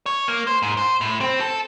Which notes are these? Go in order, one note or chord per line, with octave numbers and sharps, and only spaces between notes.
C#5
A#3
C5
G#2
C5
A2
C4
A4